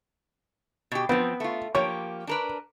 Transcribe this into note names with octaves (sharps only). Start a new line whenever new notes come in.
B2 G4
F3 B3 C4
A3 F4
F3 A#3 G4 C#5
D4 A#4 B4